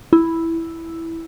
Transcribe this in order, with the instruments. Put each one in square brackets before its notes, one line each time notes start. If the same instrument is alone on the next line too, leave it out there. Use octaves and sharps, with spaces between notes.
[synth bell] E4